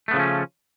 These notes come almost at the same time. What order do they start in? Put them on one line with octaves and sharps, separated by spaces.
A3 B3 C#3 F3 C#4